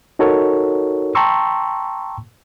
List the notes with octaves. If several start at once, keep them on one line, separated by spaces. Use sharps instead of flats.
D#4 F#4 A4 A#4 C#5
G5 A5 A#5 C6 C#6 E6